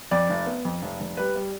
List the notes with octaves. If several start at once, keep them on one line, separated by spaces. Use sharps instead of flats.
F2 D5
F1
B3
F2
F1
F1
G3 B4
G3